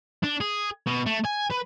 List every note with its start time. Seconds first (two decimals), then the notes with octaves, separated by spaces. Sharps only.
0.24 D4
0.41 G#4
0.87 B2
1.06 A3
1.25 G#5
1.50 B4